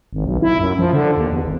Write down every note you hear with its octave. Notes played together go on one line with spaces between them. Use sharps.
G#1
B1
E4
F#2
F3
D3
D#2
E2
G#1